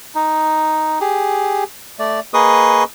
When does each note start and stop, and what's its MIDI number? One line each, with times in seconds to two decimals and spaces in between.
0.15 0.99 63
1.01 1.64 67
1.01 1.64 68
1.99 2.20 57
1.99 2.20 74
2.34 2.84 58
2.34 2.84 68
2.34 2.84 71
2.34 2.84 75
2.34 2.84 85
2.34 2.84 87